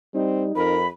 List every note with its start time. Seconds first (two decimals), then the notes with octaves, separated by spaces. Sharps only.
0.14 G3 C4 D#4
0.56 F2 A#4 B5